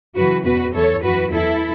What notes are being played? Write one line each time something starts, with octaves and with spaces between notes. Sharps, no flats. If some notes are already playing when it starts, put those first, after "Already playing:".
F#2 C#3 E3 F#4 B4
E2 B2 F#4 B4
E2 E3 A4 C#5
F#2 E3 F#4 B4
E2 E3 E4 A4